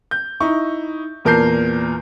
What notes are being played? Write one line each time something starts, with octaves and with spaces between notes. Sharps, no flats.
G6
D#4 E4 C#6
E2 A#2 A#4 A5 G6 C7